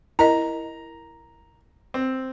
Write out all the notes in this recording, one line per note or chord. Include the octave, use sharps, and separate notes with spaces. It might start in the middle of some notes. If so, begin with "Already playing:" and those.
E4 A#4 D#5 A#5
C4